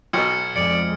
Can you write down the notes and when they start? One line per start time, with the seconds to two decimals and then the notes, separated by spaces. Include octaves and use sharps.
0.13 B1 B2 F6 G#6 C#7
0.56 F2 G#3 D5 C#7 D7